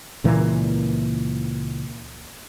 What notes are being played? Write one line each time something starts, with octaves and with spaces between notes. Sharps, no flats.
C#2 A#2 E3 A#3